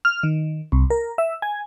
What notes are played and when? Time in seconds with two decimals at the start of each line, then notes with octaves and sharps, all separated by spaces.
0.05 F6
0.23 D#3
0.72 C2
0.90 A#4
1.18 E5
1.42 G#5